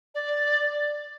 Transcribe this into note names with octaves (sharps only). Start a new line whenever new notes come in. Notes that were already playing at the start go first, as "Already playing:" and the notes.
D5